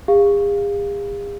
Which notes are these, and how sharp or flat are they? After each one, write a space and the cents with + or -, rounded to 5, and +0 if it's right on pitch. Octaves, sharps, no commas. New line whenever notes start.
G#4 -45 F5 +0